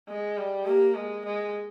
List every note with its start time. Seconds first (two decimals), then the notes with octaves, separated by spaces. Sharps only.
0.09 G#3
0.37 G3
0.66 A#3 G4
0.95 G#3
1.25 G#3